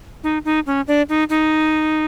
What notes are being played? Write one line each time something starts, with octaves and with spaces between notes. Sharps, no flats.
D#4
D#4
C#4
D4
D#4
D#4